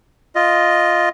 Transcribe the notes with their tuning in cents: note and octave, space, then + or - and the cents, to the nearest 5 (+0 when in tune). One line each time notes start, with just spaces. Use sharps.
F4 +0 D#5 +0